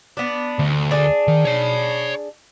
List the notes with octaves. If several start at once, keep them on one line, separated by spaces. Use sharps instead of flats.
B3 D4
D2
D4 G#4
D#3
C#5 B5